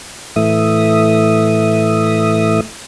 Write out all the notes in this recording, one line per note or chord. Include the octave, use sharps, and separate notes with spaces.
A2 E3 A3 E5 D#6